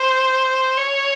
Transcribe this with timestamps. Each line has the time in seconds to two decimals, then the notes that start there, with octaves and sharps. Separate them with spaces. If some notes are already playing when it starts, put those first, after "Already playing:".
Already playing: C5
0.77 C#5